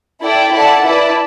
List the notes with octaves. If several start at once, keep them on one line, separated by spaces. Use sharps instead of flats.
E4 A4 D5 G5
E4 A4 D5 F#5 A5
E4 B4 D5 A5